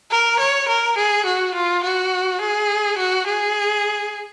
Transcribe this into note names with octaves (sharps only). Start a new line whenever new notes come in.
A#4
C#5
A#4
G#4
F#4
F4
F#4
G#4
F#4
G#4